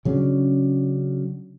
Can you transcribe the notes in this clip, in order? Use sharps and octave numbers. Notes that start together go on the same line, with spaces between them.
C#3 F#3 C#4 D4